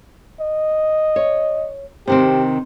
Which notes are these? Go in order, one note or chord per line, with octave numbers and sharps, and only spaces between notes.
D#5
C#5
C3 D#3 C4 G4